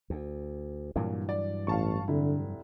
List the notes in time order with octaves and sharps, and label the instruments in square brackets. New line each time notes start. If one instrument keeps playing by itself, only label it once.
[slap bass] D2
[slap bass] G2 E3 F#3 [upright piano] A#2
[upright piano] D5
[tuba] A1 [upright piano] F5 A5 C#6
[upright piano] F1 E4 [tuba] D3